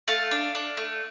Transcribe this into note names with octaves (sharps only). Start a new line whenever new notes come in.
A3 F5 A5
D4
D4
A3